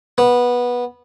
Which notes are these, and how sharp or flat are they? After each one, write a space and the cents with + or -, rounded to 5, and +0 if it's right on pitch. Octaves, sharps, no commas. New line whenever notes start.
B3 -15